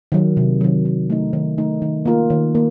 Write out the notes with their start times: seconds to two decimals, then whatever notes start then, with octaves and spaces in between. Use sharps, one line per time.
0.12 D#3 F#3
0.37 C3
0.61 D#3 F#3
0.85 D#3
1.10 A3 D#4
1.33 D#3
1.58 A3 D#4
1.82 D#3
2.05 A#3 F4 A#4
2.30 D#3
2.55 A#3